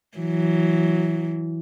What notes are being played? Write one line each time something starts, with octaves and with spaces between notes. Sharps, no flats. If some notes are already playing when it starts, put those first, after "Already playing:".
E3 F#3